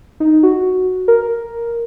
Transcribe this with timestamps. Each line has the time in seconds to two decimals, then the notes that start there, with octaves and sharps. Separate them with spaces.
0.20 D#4
0.43 F#4
1.08 A#4